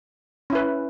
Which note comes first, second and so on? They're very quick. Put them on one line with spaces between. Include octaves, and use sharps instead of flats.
C#4 E4 B4